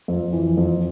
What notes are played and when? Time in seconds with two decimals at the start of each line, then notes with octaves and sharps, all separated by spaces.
0.08 F2
0.33 E3
0.57 F2